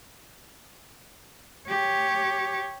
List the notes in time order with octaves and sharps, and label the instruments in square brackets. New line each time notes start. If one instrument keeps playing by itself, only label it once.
[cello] G4 C#5